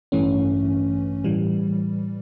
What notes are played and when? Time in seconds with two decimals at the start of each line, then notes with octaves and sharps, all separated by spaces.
0.12 A1 G2 E3 A3 C#4
1.24 A2 E3 G3